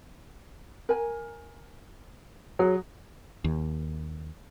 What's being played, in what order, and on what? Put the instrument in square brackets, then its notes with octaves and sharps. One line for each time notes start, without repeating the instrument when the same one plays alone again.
[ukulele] A#4 G#5
[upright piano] F#3 [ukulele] G#4
[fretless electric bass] D#2